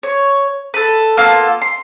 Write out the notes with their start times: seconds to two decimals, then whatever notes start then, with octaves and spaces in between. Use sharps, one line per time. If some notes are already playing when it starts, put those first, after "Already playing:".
0.03 C#5
0.74 A4 B4
1.17 A#3 B3 F4 A4
1.62 C6